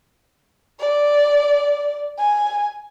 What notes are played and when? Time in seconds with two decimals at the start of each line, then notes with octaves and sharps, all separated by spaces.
0.80 D5
2.19 G#5